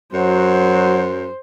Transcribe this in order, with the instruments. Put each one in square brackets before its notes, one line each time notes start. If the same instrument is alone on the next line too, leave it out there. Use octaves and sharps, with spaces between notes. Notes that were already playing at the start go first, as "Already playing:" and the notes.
[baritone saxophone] F#2 [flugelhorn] F#3 [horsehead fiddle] C5